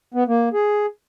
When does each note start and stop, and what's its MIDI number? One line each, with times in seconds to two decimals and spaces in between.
0.14 0.24 59
0.28 0.49 58
0.53 0.86 68